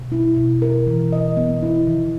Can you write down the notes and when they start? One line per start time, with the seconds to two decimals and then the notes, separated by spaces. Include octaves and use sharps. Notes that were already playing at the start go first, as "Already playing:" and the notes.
Already playing: B2
0.12 E4
0.37 B2
0.62 A#4
0.87 E3
1.12 D#5
1.37 B3
1.62 E4
1.87 D#3